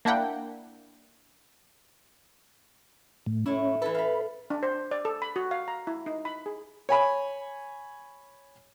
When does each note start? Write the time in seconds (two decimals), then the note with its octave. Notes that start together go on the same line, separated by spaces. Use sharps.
0.05 A#3 D4 E4 F#5 G5
3.26 A2
3.46 A2 C#4 E4
3.82 E3 E4 A4 B4
3.95 F5 B5
4.50 D4
4.63 C5
4.91 D5
5.05 A4
5.22 B5
5.36 F#4
5.51 F5
5.68 A#5
5.87 E4
6.06 D#4
6.25 B5
6.46 G#4
6.89 C#5 G#5 B5